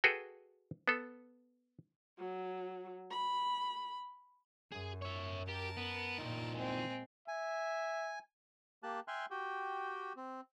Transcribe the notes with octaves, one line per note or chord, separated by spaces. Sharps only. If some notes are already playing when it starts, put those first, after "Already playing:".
F#4 G#4 A4 B4 G5
B3 A4
F#3
B5
F#2 G#4
C#5 E5
G4 A#4 A5
B3
A#2 D#3 F3
G#3 C4
E5 G#5
A#3 G4 A5 F#6
E5 G5 G#5 C6 F6 F#6
F#4 G4 G5
C4